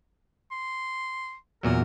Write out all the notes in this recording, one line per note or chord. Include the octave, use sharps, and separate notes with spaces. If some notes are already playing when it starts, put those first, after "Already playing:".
C6
E2 A#2 F#3 A#4